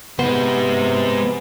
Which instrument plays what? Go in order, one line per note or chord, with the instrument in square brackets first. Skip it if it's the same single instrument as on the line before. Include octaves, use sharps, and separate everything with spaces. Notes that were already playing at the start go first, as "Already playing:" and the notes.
[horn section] C3 [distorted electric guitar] G#3 C5 [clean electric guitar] B3